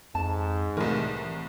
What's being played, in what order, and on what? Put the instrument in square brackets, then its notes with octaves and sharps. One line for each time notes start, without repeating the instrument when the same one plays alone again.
[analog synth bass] F2 [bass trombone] G#2 [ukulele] A5
[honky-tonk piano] C2 A2 [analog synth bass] E3 [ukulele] A#4